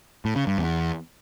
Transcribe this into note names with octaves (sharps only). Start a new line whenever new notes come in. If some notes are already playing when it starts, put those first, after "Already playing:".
A2
C#3
G2
E2